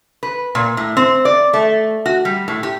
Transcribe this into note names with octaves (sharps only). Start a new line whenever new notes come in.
B4
A#2
A2
C4
D5
A3
F#4
G3
A2
G4